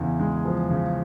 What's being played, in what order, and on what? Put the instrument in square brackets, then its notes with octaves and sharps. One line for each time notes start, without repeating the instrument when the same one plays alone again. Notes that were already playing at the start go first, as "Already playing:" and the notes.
Already playing: [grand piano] E2 C#3
G#3
F3
C#3